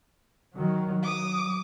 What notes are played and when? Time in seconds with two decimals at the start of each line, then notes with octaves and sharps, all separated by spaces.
0.55 D#3 F#3
1.03 F#3 D6 D#6